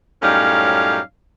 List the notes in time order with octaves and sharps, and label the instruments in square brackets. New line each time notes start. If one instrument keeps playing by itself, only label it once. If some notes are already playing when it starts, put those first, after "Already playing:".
[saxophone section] F#2 A2 G3 C#4 D#4 F5